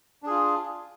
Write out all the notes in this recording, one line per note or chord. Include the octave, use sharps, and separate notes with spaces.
D4 F4 G#4